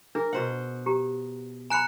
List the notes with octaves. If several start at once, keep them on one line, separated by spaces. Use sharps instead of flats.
D4 G#4 A#4
B2 C5 F#5
G4 A#5
G#5 A#5 B5 F#6 C#7